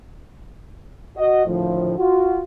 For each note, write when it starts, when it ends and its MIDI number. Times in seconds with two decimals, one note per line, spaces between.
1.16 1.45 66
1.16 1.45 75
1.46 1.93 38
1.46 1.93 45
1.46 1.93 51
1.46 1.93 53
1.98 2.39 65
1.98 2.39 66